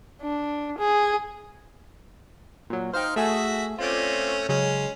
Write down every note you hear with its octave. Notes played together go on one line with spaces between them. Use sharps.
D4
G#4
A#2 F#3
D#4 C5 F5 G5 F6
A3 F#4 G#4 A4 E5
A3 C4 C#4 F4 D5
C#3 F#3 G#3 C#4